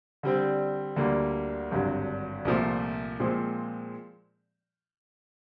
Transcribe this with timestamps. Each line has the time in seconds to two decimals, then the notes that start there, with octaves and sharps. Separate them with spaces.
0.23 D3 G3 C4
0.96 D2 D3 G3 A#3
1.71 G#1 G2 D3 F#3
2.45 C2 A#2 F3 A3
3.20 A#2 F3 G#3 C4